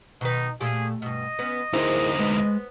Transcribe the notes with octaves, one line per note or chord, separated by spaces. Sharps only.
B2 D#3 D#4 B4
A#2 A3 G4 G#4
G2 B2 D#5
B3 C#4
D2 D#4 E4 G#4 A#4 C5
G#3 B3